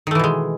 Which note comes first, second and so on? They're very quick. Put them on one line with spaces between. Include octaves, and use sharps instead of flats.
D#3 A3 E3 B2 G#3